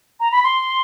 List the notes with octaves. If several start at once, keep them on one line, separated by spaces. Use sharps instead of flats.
A#5
B5
C6